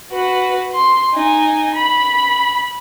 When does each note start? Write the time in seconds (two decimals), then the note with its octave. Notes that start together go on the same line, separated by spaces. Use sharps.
0.12 F#4 B4
0.74 C6
1.14 D#4 G#5
1.74 B5